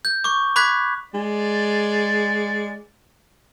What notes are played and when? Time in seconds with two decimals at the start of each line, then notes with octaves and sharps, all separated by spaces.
0.05 G6
0.24 C#6 D6
0.56 B5 D6 F#6 G#6 B6
1.14 G#3 D5